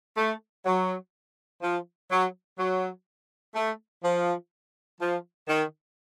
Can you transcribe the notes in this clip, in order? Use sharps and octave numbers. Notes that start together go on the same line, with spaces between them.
A3
F#3
F3
F#3
F#3
A3
F3
F3
D#3